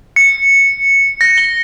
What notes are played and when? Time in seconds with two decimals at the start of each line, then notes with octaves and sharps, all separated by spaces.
0.16 C#7
1.21 A#6
1.38 G7